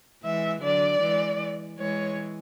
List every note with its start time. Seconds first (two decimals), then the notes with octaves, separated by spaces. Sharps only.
0.24 E3 G#3 E5
0.62 D3 F#3 D5
1.01 E3 G#3
1.79 E3 G#3 C#5